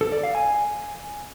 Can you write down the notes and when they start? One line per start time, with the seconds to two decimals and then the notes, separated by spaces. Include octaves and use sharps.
0.01 A4
0.12 D5
0.23 F5
0.35 G#5